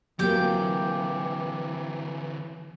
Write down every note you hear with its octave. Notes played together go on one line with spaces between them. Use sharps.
D3 E3 F#3 A#3 C4 G4 G5